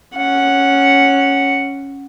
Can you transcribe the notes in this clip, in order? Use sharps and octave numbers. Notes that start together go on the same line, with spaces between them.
C#4 F#5